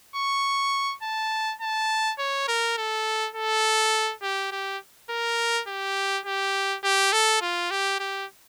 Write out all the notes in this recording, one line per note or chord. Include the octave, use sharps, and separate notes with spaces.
C#6
A5
A5
C#5
A#4
A4
A4
G4
G4
A#4
G4
G4
G4
A4
F4
G4
G4